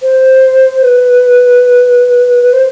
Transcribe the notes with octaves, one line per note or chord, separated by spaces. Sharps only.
C5
B4
B4
C5